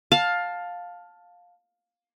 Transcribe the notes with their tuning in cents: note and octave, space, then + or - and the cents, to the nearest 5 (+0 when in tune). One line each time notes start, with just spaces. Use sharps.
F5 +15 A5 +5